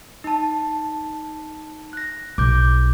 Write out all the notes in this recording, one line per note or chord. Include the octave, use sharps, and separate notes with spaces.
D#4 A5
F#6 A#6
B1 D6 G6